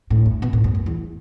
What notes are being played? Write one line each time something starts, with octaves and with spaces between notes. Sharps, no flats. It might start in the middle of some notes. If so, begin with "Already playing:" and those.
A2
G2
B2
A2
F#2
F#2
E2